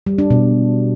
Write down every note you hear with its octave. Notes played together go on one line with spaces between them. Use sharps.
G3
D4
B2